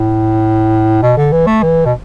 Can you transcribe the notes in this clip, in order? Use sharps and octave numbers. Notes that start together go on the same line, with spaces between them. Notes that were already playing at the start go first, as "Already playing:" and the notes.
Already playing: A2
B2
D3
E3
A3
E3
B2